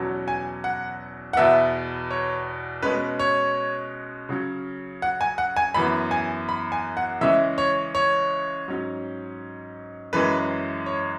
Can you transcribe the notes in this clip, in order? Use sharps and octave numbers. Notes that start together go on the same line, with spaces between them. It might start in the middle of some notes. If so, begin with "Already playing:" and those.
Already playing: E2 B2 F#3 C#4
G#5
F#5
F#5
E2 B2 B3 E5
C#5
B2 G#3 C#4 B4
C#5
C#3 F#3 C#4
F#5
G#5
F#5
G#5
F#2 E3 B3 B5
G#5
B5
G#5
F#5
C#3 E3 G#3 C#4 E5
C#5
C#5
G#2 F#3 C#4
F#2 E3 G#3 C#4 B4
C#5